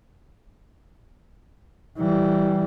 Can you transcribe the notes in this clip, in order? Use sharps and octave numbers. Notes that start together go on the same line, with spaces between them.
E3 G3